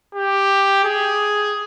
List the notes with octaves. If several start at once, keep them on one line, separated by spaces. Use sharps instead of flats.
G4
G#4